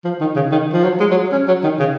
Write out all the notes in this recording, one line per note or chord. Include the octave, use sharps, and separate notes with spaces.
F3
D#3
C#3
D#3
F3
F#3
G#3
F#3
C#4
F#3
D#3
C#3